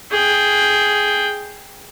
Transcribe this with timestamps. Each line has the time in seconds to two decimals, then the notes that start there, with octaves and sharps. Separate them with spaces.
0.11 G#4 G5